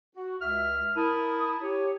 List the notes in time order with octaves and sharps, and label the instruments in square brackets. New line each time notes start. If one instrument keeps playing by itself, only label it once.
[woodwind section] F#4
[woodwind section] C#2 E5 [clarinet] F6
[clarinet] E4 [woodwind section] A#4 A5 D#6
[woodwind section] G4 C#5